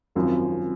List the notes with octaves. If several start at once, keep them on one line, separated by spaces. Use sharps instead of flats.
G#1 F#2 F3 C4